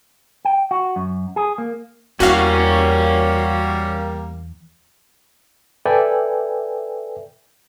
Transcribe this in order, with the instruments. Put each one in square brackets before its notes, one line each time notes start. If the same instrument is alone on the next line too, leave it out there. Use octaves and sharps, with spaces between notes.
[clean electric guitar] G5
F#4
F#2
G#4
A#3
[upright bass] E2 [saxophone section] G3 A#3 [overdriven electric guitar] C#4 C#5 [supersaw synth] F#4 F5
[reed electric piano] A4 B4 D5 E5 G5 G#5